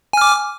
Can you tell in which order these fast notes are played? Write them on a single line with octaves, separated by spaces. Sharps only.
G#5 F6 D6